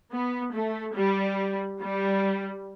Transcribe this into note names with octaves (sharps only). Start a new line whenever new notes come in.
B3
A3
G3
G3